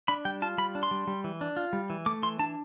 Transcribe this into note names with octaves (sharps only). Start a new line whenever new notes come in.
D4 B5
G3 G5
F4 A5
G3 B5
D4
C6
G3
G3
E3
D4
F4
G3
E3
A3 D6
E3 C6
D4 A5